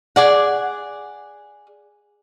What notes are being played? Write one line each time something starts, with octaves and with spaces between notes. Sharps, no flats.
G#4 D5 F#5